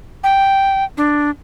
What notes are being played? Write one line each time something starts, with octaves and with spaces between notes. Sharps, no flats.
G5
D4